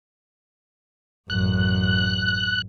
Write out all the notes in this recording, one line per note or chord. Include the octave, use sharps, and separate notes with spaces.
A1 F#2 F#6